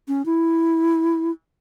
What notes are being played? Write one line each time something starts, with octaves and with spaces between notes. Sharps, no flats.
C#4
E4